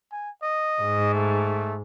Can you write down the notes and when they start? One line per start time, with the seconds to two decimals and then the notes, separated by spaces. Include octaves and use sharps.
0.12 G#5
0.43 D#5
0.82 G#2
1.15 A3